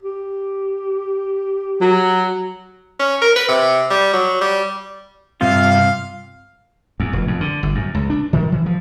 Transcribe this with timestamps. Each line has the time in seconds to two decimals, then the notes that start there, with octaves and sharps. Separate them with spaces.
0.03 G4
1.81 F#3
3.00 C#4
3.21 A#4
3.36 B4
3.49 C3
3.90 G3
4.13 F#3
4.41 G3
5.41 G2 C3 F4 F5
7.00 E2
7.13 F1
7.28 F2
7.41 D3
7.63 G1
7.75 F#2
7.95 C#2
8.10 D4
8.33 D#3
8.52 E3
8.66 F3